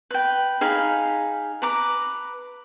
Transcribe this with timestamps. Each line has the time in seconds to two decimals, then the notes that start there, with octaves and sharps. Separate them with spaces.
0.11 B4 G5
0.61 D#4 G#4 F5 B5
1.62 B4 A#5 D6